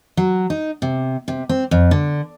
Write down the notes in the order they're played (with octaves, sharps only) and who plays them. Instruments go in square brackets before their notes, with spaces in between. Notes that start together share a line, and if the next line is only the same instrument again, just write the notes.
[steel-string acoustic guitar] F#3
D#4
C3
C3
C4
F2
D3